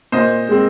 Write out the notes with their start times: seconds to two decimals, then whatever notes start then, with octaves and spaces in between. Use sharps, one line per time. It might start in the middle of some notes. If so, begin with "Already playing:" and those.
0.12 A#2 C5 D#5
0.49 G#3 C4